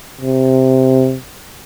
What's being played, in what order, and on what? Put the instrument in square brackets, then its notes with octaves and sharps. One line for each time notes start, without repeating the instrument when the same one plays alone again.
[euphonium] C3